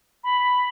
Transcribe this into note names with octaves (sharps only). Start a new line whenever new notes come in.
B5